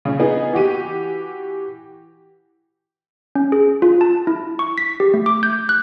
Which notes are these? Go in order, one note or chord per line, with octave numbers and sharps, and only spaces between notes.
C#3 C#4
B3 D#4 G#4
E3 F#4 G4 D#7
C#4
G#4
F4
A5
E4
C#6
B6
G4
A3
D6
G6
F#6